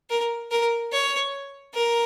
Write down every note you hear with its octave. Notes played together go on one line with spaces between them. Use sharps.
A#4
A#4
C#5
A#4